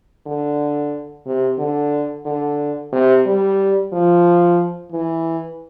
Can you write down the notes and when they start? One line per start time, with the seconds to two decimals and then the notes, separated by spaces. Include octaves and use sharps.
0.27 D3
1.26 C3
1.58 D3
2.26 D3
2.93 C3
3.26 G3
3.92 F3
4.92 E3